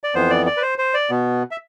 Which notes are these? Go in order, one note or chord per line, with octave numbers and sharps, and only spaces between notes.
D5
F2 E3 B3 C5
D5
D5
B4
C5
C5
D5
B2 B3
E5